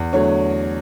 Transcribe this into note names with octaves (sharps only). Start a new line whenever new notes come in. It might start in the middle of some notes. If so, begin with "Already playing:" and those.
Already playing: E2
D3 F#3 A3 C#5